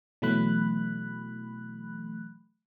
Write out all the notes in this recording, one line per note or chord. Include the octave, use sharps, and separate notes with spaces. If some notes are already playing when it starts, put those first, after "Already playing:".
B2 E3 F#3 A3 B5 F#6